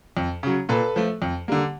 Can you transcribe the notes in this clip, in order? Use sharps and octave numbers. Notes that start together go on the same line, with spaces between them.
F2
C#3 F#3
A#2 A4 B4
F3 A3
F2
D3 G3 A#3